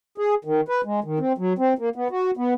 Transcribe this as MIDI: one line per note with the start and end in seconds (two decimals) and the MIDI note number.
0.18 0.35 68
0.45 0.61 51
0.68 0.81 71
0.85 1.00 56
1.04 1.19 51
1.19 1.33 60
1.38 1.53 54
1.58 1.73 60
1.79 1.89 58
1.96 2.08 59
2.11 2.31 66
2.37 2.54 59